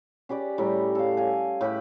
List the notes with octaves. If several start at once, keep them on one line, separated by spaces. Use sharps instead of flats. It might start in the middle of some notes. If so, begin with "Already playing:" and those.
C#4 G4 B4 D5
A2 G3 A#5
A4 F5
F5 G#5
A2 G4 B4 B5